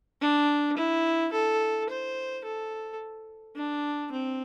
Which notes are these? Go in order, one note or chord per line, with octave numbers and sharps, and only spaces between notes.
D4
E4
A4
C5
A4
D4
C4